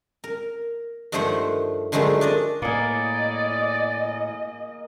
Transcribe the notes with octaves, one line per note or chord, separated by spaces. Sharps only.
A#4
G2 D#3 F3 A3 C5 F#5
D3 D#3 F3 F#3 G#3 A3
D4 D5 D#5
A2 A#3 G#4 D5 D#5